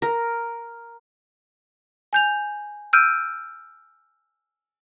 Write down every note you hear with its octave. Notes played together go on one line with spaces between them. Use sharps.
A#4
G#5 G6 F7
E6 F6 G6 D7 D#7